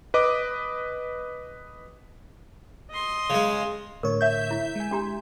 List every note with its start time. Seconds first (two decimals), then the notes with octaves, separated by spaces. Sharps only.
0.14 B4 D#5 D6
2.91 D#5 C6
3.30 C#3 G#3
4.03 A2 D3 A#4 C#5
4.21 E5 G6
4.51 E4
4.76 G#3 G#5
4.91 D4 G4 A#5